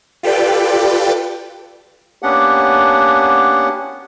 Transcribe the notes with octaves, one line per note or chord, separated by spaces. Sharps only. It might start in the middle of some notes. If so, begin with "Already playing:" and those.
F4 G4 A4 B4 D5 G5
A#3 B3 C#4 D4 G4 F#5